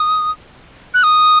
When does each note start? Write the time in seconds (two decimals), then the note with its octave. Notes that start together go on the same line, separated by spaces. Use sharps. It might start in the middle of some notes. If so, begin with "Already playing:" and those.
Already playing: D#6
0.94 F#6
1.03 D#6